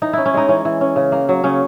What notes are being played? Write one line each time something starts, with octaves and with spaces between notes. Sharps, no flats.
E3 D#4
C#4 E4
C#4
G#3 D#4
E3 C#4
E3
C#4
C#3
A#3
F#3
C#3 C#4